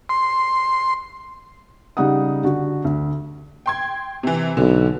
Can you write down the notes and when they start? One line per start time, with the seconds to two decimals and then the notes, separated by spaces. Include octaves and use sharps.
0.09 C6
1.97 C#3 G3 D#4 F#5 D#6
2.44 D3 F#4
2.85 D2
3.66 G5 C6 G#6
4.23 C3 E3
4.57 B1 D3